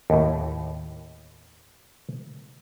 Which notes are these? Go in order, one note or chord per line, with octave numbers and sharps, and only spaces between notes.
D#2 A2